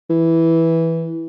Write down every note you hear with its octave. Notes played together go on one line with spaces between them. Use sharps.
E3